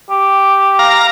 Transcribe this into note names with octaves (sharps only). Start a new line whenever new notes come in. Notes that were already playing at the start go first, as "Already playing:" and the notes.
G4
F5 A#5